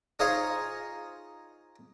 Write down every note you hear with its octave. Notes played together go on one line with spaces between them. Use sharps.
D#4 F4 G#4 C5 C#5 D#5